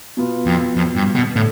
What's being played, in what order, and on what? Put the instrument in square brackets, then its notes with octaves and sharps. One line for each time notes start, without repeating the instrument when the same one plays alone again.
[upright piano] B2 B3 F4
[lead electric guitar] F2
F2
G2
B2
[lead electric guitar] A2 [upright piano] D3